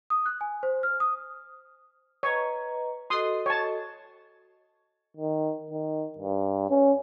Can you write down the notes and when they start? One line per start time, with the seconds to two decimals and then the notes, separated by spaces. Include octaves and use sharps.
0.10 D#6
0.26 F#6
0.41 G#5
0.63 C5
0.83 F6
1.00 D#6
2.23 B4 C#5 D#5 A#5
3.10 F#4 A4 D#5 C6 D#6
3.46 C#5 A5
5.17 D#3
5.71 D#3
6.18 G2
6.70 C#4